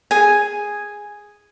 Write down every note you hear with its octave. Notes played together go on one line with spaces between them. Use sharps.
G#4 G#5